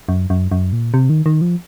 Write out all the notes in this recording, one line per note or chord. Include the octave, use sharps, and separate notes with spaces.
F#2
F#2
F#2
A#2
C3
D#3
D#3
F3